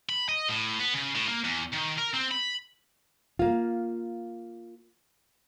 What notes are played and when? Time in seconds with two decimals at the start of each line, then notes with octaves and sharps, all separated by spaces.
0.09 B5
0.29 D#5
0.49 A2
0.79 B3
0.93 C#3
1.15 A2
1.28 A#3
1.44 E2
1.73 D#3
1.99 A#4
2.14 C4
2.31 B5
3.39 A#3 F4